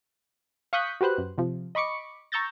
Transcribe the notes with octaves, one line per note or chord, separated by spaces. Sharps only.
F5 C#6 D#6 F#6 G6 B6
F#4 G4 B4 C5 F#6
F#2
C3 F3
D#5 B5 C#6 D6 C#7
A#5 C#6 E6 G6 A6 A#6